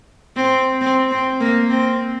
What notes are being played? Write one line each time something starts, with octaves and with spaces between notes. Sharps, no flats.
C4
C4
C4
A#3
C4